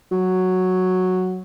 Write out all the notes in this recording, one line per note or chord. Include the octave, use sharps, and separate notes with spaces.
F#3